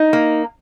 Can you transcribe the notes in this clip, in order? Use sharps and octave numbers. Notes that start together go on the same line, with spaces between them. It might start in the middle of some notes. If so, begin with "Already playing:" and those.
Already playing: D#4
A#3